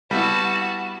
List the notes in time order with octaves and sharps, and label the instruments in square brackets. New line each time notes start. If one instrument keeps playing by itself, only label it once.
[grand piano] G3 B3 E4 [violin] F#4 A5